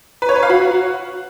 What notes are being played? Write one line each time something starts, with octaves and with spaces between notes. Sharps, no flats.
B4
C#5
B4
F5
F#4